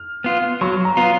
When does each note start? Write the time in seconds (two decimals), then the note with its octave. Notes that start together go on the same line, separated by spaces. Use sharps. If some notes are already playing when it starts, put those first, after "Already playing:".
Already playing: F6
0.24 B3 F4
0.61 F#3 C#6
0.85 A#5
0.97 B3 F4